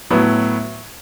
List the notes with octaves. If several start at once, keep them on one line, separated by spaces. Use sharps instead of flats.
A2 F#3 B3 E4